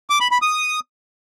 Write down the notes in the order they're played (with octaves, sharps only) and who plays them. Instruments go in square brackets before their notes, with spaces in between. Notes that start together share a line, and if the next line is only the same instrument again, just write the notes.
[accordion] D6
B5
B5
D#6